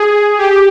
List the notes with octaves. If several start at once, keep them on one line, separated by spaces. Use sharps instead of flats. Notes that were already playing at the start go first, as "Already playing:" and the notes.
Already playing: G#4
G4